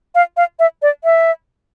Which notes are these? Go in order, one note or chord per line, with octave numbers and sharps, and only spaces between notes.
F5
F5
E5
D5
E5